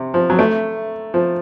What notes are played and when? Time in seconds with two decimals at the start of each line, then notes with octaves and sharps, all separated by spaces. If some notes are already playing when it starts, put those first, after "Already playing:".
Already playing: C3
0.14 F3
0.30 F#3
0.39 A3
1.14 F3